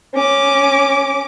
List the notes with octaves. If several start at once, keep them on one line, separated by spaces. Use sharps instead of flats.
C#4 D6